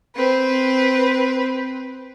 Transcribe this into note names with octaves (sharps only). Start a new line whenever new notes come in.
C4 B4